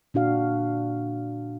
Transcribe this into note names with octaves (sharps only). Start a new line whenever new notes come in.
A#2 D4 F#4 F5